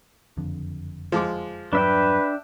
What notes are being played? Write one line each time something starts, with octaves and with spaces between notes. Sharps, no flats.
F#1 F2 D3
F3 G#3 D6
E2 G2 F#3 D4 B4 E5 G5